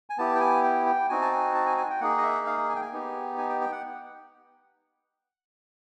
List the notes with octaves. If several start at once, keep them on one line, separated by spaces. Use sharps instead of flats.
G#5
B3 E4 G4 A5
G5
G#5
G5
G5
C4 D#4 F#4 G#5
A5
G#5
A5
G#5
G#5
G5
A#3 D#4 G#4 F#5
D#5
E5
F5
G#5
G5
G#5
B3 D#4 G4
G#5
G5
G5
F#5